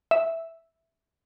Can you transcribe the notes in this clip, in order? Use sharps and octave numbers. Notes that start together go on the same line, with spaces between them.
E5